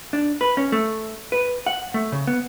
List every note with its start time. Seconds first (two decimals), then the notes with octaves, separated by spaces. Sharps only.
0.13 D4
0.41 B4
0.57 C#4
0.72 A3
1.32 B4
1.66 F#5
1.94 A3
2.12 C#3
2.27 B3